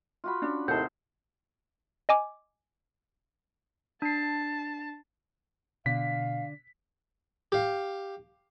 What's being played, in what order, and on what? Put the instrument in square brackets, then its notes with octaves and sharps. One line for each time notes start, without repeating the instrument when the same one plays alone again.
[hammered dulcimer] F4 F#4 B5
[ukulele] C#4 D4
[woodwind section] D#2 A2 C6 [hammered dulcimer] C3 D#4 [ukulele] F#5 A5 [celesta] G6
[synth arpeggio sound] D#5 G#5 D6
[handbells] D4 C7 [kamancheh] A5
[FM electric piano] B2 [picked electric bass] D3 [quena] F5 [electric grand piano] B6
[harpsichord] G4 F5